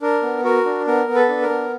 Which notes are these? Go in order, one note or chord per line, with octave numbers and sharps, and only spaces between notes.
D4 A#4
B3
F#4 A#4
D4
B3 A#4
B3
A4 B4
D4
A#4
B3